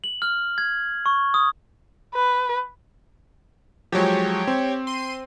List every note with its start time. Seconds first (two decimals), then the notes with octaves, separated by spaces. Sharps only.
0.04 F#7
0.22 F6
0.58 G#6
1.06 C#6
1.34 D#6
2.15 B4
3.92 F3 F#3 G#3 G4 C#5
4.47 C4
4.87 C6 D#7